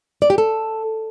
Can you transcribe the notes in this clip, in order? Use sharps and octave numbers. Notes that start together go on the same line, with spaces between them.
D5
G4
A4